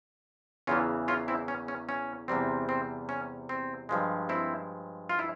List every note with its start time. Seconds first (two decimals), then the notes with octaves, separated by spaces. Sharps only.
0.67 E2 C#3 E3 C#4 F4
1.08 C#4 F4
1.28 C4 E4
1.48 C#4
1.68 C#4
1.89 C#4
2.28 E2 C3 G3 C4
2.69 C4
3.09 C#4
3.49 C4
3.89 G2 F3 G#3
4.29 C4 E4
5.09 F4
5.19 E4